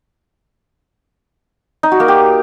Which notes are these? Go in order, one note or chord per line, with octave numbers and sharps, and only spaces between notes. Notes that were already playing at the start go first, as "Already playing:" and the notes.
D#4
F#4
A#3
G4